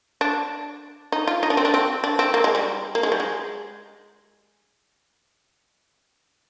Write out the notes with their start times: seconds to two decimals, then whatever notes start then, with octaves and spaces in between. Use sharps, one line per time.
0.21 D4
1.12 D#4
1.27 F4
1.43 D#4
1.50 D4
1.57 C4
1.65 D4
1.74 C4
2.04 D4
2.19 C4
2.34 A#3
2.44 G#3
2.55 G3
2.95 A#3
3.03 G#3
3.12 G3
3.20 G#3